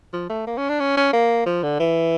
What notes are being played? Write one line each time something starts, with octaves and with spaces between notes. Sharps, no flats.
F3
A3
A#3
C#4
D4
C#4
C#4
A#3
F3
D3
E3